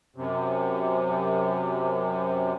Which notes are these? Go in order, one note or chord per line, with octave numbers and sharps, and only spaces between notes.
F#2 C3